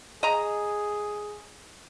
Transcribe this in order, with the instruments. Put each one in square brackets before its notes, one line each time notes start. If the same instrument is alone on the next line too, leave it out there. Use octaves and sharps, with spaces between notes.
[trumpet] G#4 [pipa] D#5 A#5